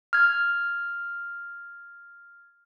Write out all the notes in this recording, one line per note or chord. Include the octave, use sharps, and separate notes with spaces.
F6 G#6